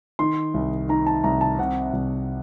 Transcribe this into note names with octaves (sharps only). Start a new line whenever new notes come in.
D#3 C6
C2
D#3 A#5
A5
C2 A#5
A5
C3 F#5
C2